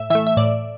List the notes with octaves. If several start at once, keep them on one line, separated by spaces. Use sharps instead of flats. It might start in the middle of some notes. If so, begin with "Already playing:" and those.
Already playing: A2 E5
E3 A3 E5
E5
A2 D5